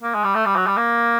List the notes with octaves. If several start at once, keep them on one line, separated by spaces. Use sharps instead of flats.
A#3
G#3
G3
A3
G3
F#3
G3
A#3